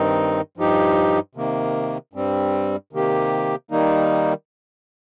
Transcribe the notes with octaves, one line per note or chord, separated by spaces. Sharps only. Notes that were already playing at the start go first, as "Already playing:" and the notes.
Already playing: G2 D#3 C4 D#4
G2 F3 D#4 G4
C3 D#3 A#3
G2 G3 C4
C3 D#3 A#3 G4
D#3 G3 A#3 D#4